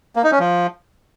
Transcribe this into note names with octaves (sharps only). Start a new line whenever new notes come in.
A#3
D#4
C#4
F3